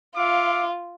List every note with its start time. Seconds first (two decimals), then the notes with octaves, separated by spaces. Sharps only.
0.16 F4 E5 F5 D6